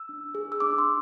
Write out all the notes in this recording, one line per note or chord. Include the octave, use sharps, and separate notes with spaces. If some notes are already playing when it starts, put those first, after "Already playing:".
Already playing: E6
D4
G#4
E6
D4 D6
C6